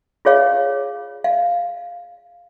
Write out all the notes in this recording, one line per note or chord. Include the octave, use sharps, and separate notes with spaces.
F4 G#4 C#5 F5
F5